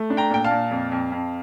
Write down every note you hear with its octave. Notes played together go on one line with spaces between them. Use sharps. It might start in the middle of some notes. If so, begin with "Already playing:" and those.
Already playing: A3
D4
G5 A#5
A#2 G5
F5 A5
A#2
F2
F2
F2